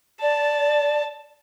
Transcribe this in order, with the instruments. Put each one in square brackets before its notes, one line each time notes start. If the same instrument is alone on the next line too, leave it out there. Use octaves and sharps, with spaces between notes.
[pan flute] D5 [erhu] A5